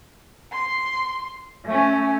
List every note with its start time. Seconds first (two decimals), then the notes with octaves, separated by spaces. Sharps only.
0.50 C6
1.66 A3 C#4